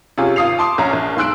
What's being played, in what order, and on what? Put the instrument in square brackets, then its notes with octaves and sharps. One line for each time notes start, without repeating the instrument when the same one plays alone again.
[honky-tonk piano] C3 C#4 F4 G#4
G#1 F4 D#6 C7 F7
A5 C6 D6 D#6
A#1 C#4 E5 A#5
A#1
B1 G#2 C6 E6 F#6 D7